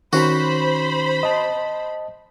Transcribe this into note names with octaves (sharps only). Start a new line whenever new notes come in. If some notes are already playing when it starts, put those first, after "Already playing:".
D#3 C#4 F#4 C5 B5
D#5 A5